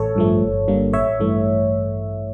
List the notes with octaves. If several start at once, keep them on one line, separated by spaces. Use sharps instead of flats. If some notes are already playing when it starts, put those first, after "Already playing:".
Already playing: A1 A4 C#5
G2 F3 A3
G1
G2 D3 G3 A#3
A1 C#5 E5
G2 E3 A3